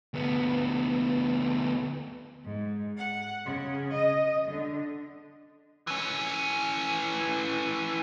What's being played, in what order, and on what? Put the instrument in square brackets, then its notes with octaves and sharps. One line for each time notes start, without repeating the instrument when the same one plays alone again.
[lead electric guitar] D2 B3
[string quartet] G#2
F#5
C#3
D#5
D3
[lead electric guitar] E3 C#4